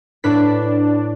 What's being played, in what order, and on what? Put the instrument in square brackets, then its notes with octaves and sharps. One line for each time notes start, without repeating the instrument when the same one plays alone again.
[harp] A2 B4 B6 [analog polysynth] D4